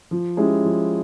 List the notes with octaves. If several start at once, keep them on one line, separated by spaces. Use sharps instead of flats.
F3
G#3 C#4 E4 G4
F3